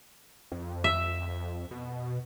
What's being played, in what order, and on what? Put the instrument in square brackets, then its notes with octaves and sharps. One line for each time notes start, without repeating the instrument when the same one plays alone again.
[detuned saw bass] F2
[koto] E5
[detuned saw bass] B2